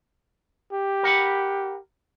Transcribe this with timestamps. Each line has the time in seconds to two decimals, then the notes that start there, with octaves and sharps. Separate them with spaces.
0.72 G4
1.03 A#4 F#5 B5